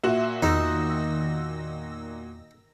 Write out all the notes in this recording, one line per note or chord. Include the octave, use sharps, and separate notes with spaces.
A#2 F#4 E5
E2 D#3 D#4 E6 A#6